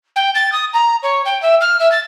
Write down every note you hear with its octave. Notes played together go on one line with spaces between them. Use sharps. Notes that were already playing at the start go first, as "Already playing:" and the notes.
G5
A6
D#6
A#5
C#5
G5
E5
F6
E5
A6